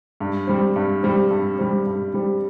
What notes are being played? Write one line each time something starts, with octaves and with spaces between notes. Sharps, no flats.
G2
G3 C4
G2
G3 C4
G2
G3 C4
G2
G3 C4